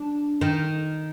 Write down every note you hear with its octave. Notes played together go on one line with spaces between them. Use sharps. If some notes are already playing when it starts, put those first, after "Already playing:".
Already playing: D4
D#3